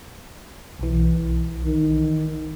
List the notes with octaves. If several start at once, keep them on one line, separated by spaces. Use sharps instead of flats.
B1 E3
D#3